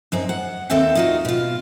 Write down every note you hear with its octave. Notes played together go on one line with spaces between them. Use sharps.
F#2 C4 D#4
F#5
D#2 C4 A4 E5 G5
D#4 F4 F#4
B2 F4